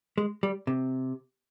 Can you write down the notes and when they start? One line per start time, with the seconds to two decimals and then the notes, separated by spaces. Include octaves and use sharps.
0.18 G#3
0.43 G3
0.67 C3